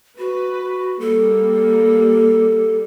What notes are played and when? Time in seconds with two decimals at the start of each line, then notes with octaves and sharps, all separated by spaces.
0.18 F#4 B4
1.00 G3 A#3 A4